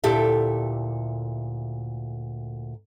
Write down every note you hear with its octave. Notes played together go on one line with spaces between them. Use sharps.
D2 A#2 E4 G4 A4 E5